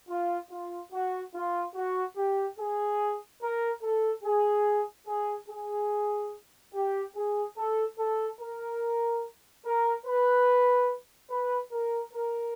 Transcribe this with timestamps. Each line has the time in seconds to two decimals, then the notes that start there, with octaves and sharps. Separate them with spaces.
0.09 F4
0.50 F4
0.92 F#4
1.34 F4
1.75 F#4
2.16 G4
2.58 G#4
3.41 A#4
3.82 A4
4.24 G#4
5.06 G#4
5.48 G#4
6.74 G4
7.15 G#4
7.56 A4
7.98 A4
8.40 A#4
9.64 A#4
10.06 B4
11.30 B4
11.72 A#4
12.13 A#4